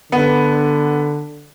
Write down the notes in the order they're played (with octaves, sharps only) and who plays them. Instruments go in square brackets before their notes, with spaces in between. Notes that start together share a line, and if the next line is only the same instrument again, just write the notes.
[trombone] D3 [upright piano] B3